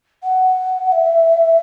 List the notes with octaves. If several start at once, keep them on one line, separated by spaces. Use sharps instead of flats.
F#5
E5